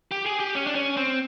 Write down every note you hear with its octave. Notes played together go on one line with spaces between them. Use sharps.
G4
G#4
G4
C#4
D4
C#4
C4